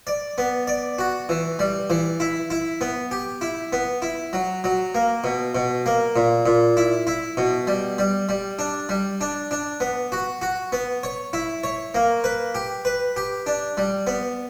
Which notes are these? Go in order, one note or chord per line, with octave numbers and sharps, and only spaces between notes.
D5
B3
D5
F#4
E3
G3
E3
E4
E4
B3
G4
E4
B3
E4
F#3
F#3
A#3
B2
B2
A#3
A#2
A#2
E4
E4
B2
G3
G3
G3
D4
G3
D4
D4
B3
F#4
F#4
B3
C#5
E4
C#5
A#3
B4
G4
B4
G4
D4
G3
B3